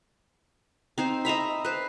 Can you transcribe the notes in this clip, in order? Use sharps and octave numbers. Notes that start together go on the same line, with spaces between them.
C4 D#4 C5
D#5 E5 A#5 B5
B4 C5